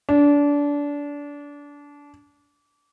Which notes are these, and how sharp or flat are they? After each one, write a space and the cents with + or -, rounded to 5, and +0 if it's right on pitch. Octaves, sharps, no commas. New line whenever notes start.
D4 -25